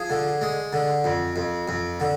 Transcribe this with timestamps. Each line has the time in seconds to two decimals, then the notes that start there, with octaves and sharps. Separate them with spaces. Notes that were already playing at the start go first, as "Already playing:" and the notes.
Already playing: F3 G#4
0.10 D3
0.41 G#3
0.73 D3
1.04 F2
1.36 F2
1.68 F2
2.00 D3